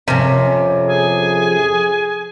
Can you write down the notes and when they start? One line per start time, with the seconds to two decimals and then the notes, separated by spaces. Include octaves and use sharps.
0.08 F2 C3 C#4 A#4
0.88 G#4 G#5